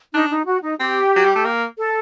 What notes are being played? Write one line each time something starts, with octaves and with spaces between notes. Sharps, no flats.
D4 D#4
D#4
F#4
D#4
C4 G4
F#3
G3
A3
A#3
A4